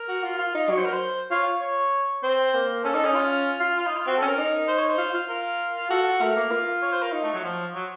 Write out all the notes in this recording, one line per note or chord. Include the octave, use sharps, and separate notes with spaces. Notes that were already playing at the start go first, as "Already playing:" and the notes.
Already playing: A#4
F#4
F4
F4
D#4
F#3 C#5
C5
A#4
C5
F4 C#5
C#5
C4 C5
A#3
C#4 A4
D#4 A4
C#4 D#4
F4
F4
F4
D#4
F4
C4 F#4
A4
C#4
A#4
D#4
C5
C#5
C5
F4
F4
A#4
F#4 A4
A3 A#4
A#3
F4
C#5
C5
A#4
D#4
A3
F#3
F3
F#3